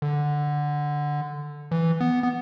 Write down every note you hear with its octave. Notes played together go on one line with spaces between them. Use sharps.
D3
E3
B3
B3